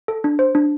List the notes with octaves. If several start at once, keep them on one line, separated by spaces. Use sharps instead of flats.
A4
D4
C5
D4